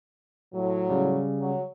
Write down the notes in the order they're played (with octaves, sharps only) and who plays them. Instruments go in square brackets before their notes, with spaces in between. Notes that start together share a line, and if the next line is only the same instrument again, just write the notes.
[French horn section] A2 F#3
[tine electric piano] C#3 G3
[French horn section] F#3